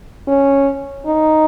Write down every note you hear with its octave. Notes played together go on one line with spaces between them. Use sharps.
C#4
D#4